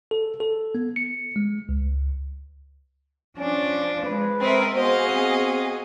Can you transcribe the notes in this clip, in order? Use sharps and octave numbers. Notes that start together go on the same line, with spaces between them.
A4
A4
B3
C#7
G#3
C#2
F3 C#4 D4
G#3 B4
C4 A#4 D#5 E5
B3 F#4 G#4 C5 D#5 F5
C4